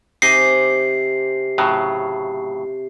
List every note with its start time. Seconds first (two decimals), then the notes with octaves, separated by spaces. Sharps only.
0.22 C3 D#4 D#5 G#5 D6 C7
1.58 A2 C#3 F#3